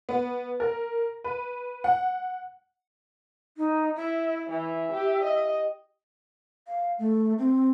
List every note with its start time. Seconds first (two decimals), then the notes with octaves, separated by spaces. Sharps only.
0.09 B3
0.60 A#4
1.24 B4
1.84 F#5
3.58 D#4
3.96 E4 E5
4.49 E3 E5
4.92 G4
5.23 D#5
6.67 F5
6.99 A3
7.38 C4